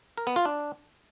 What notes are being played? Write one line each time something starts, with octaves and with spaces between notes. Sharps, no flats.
A#4
B3
F4
D4